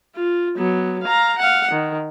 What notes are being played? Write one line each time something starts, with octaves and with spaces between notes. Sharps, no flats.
F4
F#3 B3
F5 A#5
F5 F#5
D#3